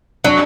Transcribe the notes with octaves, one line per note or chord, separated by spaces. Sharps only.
F#3 D4